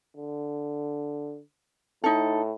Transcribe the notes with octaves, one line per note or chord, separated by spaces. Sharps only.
D3
A2 D#4 A4